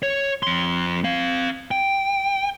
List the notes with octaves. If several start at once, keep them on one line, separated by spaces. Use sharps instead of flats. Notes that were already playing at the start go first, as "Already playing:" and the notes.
C#5
F2 C6
C4 F5
G5